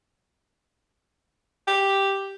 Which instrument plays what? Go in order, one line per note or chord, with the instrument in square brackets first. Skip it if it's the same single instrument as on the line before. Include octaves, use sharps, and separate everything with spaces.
[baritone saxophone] G4